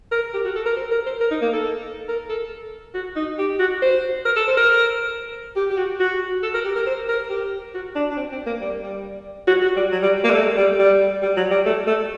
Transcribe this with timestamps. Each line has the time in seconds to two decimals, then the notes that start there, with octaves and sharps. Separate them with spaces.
0.11 A#4
0.34 G4
0.45 F#4
0.56 A4
0.66 A#4
0.76 C5
0.91 A#4
1.06 C5
1.21 A#4
1.31 D#4
1.41 A#3
1.53 A4
2.08 A#4
2.29 A4
2.94 F#4
3.16 D#4
3.38 G4
3.59 F#4
3.82 C5
4.25 A#4
4.36 A4
4.47 C5
4.57 A#4
5.56 G4
5.70 G4
5.77 F#4
6.00 F#4
6.43 A4
6.54 A#4
6.65 G4
6.76 A#4
6.86 C5
7.08 A#4
7.30 G4
7.74 F#4
7.95 D4
8.10 D4
8.17 C4
8.32 C4
8.46 A#3
8.61 G3
8.83 G3
9.48 F#4
9.62 F#4
9.76 G3
9.92 F#3
10.02 G3
10.24 A#3
10.31 G3
10.34 A3
10.57 G3
10.79 G3
11.22 G3
11.36 F#3
11.51 G3
11.66 A3
11.87 A3